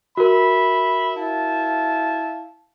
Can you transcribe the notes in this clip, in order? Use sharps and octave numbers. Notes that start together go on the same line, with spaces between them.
F#4 A#4 E5 B5
E4 F5 A5